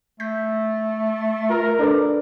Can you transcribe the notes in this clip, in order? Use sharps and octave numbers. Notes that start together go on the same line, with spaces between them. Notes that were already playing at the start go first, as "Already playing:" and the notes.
A3 G6 A#6 B6
F4 A#4
D4 A4 B4 D5